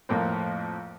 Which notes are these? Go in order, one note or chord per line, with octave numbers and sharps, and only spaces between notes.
F2 A2 A#3 C4